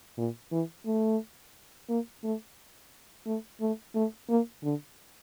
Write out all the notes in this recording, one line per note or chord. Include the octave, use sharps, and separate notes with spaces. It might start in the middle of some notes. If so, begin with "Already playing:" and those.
A#2
E3
A3
A#3
A3
A3
A3
A3
A#3
D3